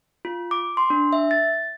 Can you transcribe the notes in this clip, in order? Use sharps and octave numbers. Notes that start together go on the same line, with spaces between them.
F4
D6
C6
D4
E5
A6